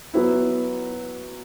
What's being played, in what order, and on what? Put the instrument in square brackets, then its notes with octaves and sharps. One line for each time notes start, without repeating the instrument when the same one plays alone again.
[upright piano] F#3 B3 E4